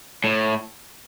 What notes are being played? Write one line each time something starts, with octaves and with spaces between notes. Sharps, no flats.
A2